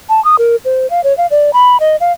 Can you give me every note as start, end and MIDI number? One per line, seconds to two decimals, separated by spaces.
0.09 0.23 81
0.25 0.36 87
0.39 0.56 70
0.65 0.89 72
0.90 1.01 77
1.04 1.16 73
1.18 1.27 77
1.31 1.53 74
1.53 1.80 83
1.80 1.96 75
2.00 2.12 77